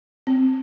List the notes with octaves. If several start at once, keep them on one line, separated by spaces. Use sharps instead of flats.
C4